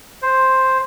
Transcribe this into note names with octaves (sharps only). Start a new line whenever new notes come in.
C5